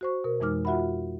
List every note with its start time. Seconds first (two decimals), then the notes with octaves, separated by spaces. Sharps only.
0.01 F#4 C5 C#6
0.24 B2 A#4
0.40 F2 E3 G#3 D#4 D6 F6
0.65 F4 F#4 E5 F#5 B5